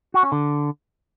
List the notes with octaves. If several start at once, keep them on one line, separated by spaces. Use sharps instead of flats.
F#4
C#4
D3